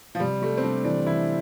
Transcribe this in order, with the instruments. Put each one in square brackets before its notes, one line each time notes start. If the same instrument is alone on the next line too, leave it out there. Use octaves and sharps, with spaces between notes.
[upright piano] F3
[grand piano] C3 [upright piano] G3
[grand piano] G3 [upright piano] A3
[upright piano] C4
[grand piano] G3 [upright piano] D4
[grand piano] E3 [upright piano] D4
[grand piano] E3 [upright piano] E4